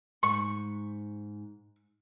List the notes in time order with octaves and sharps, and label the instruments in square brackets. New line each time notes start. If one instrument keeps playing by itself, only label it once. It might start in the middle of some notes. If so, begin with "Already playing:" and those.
[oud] G#2 [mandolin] C#6